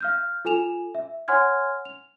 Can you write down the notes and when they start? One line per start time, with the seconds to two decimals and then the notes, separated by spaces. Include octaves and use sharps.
0.01 F5 F6 G6
0.45 F4 A4 G#5 E7 F7
0.95 E5
1.28 C#5 F#5 G#5 C6 F6 G#6
1.85 F7